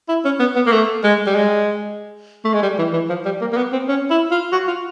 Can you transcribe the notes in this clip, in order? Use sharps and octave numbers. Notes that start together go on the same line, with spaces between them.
E4
C#4
B3
B3
A#3
A3
G#3
G3
G#3
A3
G#3
G3
E3
E3
F3
G3
A#3
A#3
B3
C4
C#4
E4
F4
F#4
F4